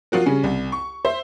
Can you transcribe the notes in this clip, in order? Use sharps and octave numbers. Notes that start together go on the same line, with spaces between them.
F3 F4 F#4 A#4
C#3 G3 C#4
C2
C#6
C5 E5